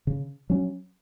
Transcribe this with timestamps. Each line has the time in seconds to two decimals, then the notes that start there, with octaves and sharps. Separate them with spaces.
0.07 C#3
0.50 F#3 C#4